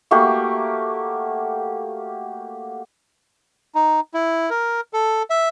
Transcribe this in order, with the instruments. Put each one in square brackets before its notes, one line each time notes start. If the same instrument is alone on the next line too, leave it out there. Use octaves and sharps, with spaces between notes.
[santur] A3 A#3 F#4 G4
[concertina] D#4
E4
A#4
A4
E5